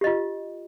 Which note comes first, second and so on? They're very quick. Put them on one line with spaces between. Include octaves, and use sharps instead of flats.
G4 D#5 F4